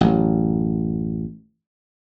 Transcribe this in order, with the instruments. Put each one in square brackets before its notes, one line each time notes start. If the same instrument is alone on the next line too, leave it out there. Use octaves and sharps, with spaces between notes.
[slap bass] A1 F#2